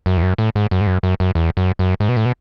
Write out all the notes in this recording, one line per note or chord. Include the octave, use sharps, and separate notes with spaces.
F#2
E2
F#2
A2
G#2
F#2
G#2
F#2
F#2
F#2
E2
F#2
F#2
G#2
B2
A2
B2